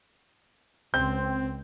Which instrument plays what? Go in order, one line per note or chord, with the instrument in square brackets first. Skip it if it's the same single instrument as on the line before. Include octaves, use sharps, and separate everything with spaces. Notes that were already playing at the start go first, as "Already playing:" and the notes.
[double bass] C#2 [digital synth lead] C4 [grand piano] G6